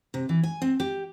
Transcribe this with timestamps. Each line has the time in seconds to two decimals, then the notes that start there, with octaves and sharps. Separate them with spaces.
0.14 C3
0.29 E3
0.44 G#5
0.62 C4
0.80 G4